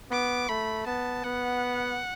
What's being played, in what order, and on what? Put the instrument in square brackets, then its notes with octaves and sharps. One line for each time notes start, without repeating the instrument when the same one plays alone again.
[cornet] B3 [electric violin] D6
[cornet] A3 [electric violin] B5
[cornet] B3 [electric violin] A5
[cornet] B3 [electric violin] F#5